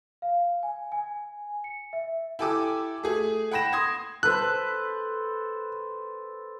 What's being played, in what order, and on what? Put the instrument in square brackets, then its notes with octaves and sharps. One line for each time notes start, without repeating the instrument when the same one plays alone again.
[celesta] F5
G#5
G#5
C#7
E5
[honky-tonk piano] E4 G4 A4 G#5 D6 E6
A3 G#4
F#5 G5 B5 A#6 E7
C6 D#6 G#6 A#6
[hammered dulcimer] A4 B4 C5 [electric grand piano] F#6